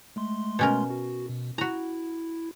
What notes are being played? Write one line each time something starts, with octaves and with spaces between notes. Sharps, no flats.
G#3 A3 C6
B2 C#4 A#4
F#4
B2
E4 F#4 A#5